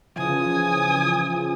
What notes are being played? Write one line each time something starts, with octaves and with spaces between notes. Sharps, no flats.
C#3 E3 F3 G#5 D#6